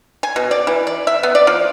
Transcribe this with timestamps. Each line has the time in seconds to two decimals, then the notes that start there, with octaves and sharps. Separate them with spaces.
0.23 G#5
0.36 B2
0.51 D5
0.67 E3
0.87 D5
1.07 E5
1.23 B3
1.35 D5
1.47 F3